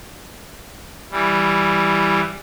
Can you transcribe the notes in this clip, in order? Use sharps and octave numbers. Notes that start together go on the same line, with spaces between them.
E3 G3